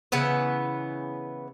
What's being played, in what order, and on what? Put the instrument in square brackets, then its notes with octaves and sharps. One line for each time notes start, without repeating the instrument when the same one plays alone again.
[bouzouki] C#3 E3 B3 B4